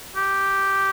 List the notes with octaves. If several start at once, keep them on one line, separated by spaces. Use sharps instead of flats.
G4